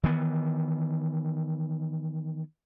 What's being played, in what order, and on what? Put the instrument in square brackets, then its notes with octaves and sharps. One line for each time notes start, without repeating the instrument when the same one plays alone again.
[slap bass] D#3 E3 B3